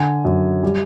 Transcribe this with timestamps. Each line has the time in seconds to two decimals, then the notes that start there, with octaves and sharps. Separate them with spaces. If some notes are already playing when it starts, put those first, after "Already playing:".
Already playing: D3 G#5
0.25 F#2
0.63 G3